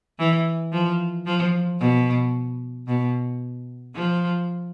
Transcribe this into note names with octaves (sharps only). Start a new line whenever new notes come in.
E3
F3
F3
B2
B2
F3